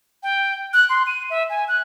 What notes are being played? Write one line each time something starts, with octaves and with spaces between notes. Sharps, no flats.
G5
F#6
C6
D#7
E5
G#5
F#6